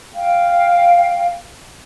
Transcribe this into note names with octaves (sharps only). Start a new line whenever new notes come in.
F5 G5